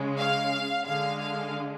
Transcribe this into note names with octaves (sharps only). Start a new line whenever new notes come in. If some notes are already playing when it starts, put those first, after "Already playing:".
Already playing: C#3 G#3
F5
D3 G#3 F5
F5